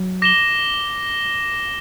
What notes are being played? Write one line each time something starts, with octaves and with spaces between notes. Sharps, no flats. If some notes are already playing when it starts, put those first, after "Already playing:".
Already playing: F#3
D6 A#6 E7 G7